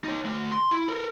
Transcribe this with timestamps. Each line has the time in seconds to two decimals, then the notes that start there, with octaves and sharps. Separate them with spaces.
0.04 D#4 C#5
0.25 A3 D5
0.52 C6
0.71 E4
0.88 A4 A#4